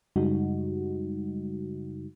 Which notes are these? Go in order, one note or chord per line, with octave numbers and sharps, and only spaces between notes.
F#2 C#3 G3 G#3 D#4 F#4